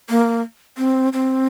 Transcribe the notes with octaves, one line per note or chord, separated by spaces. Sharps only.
A#3
C4
C4